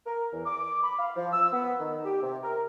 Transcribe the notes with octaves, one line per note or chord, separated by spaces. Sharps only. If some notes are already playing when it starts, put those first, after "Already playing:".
A#4
E2
D6
B5
F5
F3
E6
B3
D#3
G4
C3
A#4